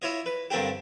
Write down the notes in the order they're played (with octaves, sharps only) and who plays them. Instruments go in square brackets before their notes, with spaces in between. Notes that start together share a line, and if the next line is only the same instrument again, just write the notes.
[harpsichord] E4 F4 C#5 D#5
B4
G2 D3 A#3 C4 D4 G4